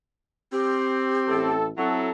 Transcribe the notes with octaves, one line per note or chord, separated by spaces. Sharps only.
C4 G4
A1 A2 A4
F#3 C4 E4 A4